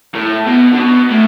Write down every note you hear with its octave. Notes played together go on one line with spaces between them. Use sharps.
A2
B2
D3
B2
A2